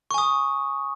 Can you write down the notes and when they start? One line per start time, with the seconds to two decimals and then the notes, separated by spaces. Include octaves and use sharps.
0.11 C#6
0.14 G#5
0.18 D#6